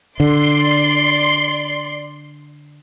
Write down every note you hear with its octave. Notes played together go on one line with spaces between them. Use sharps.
D3 D5 C6